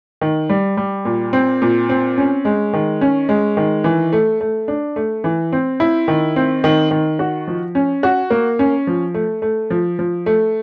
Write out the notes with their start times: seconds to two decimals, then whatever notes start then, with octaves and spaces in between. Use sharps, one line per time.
0.21 D#3
0.49 G3
0.77 G3
1.05 A#2
1.33 C4
1.62 A#2
1.89 C4
2.18 C#4
2.45 G#3
2.73 D#3
3.01 C#4
3.29 G#3
3.57 D#3
3.84 E3
4.13 A3
4.41 A3
4.68 D4
4.96 A3
5.24 E3
5.53 C4
5.80 E4
6.08 D#3
6.36 C4
6.64 D#3
6.91 D#3
7.19 F#4
7.47 F3
7.75 C#4
8.03 F#4
8.30 A#3
8.59 C#4
8.87 F3
9.14 A3
9.42 A3
9.70 F3
9.99 F3
10.26 A3